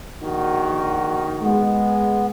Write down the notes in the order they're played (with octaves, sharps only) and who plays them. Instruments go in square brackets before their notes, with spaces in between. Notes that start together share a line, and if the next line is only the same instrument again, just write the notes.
[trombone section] A#1 D#3 F#4
[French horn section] G#3 [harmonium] B3